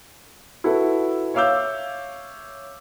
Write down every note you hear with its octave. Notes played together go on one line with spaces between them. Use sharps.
E4 F#4 A4 B4
C#5 E5 F5 D6 E6 G6